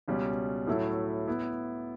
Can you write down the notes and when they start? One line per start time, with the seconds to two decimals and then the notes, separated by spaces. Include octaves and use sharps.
0.08 C#2 B2 G3 C#4
0.67 A2 F#3 A3 E4
1.28 B3 E4